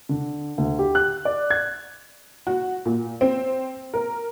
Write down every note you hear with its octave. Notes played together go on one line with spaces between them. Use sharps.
D3
D2
G4
F#6
D5
G#6
F#4
A#2
C4
A#4